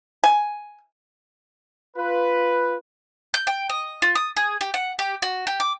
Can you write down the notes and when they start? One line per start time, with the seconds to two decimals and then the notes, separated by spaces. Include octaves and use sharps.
0.24 G#5
1.96 F4 B4
3.34 G6
3.47 G5
3.70 D#5
4.02 F4
4.15 D#6
4.37 G#4
4.61 G4
4.74 F#5
4.99 G4
5.22 F#4
5.47 G4
5.60 D6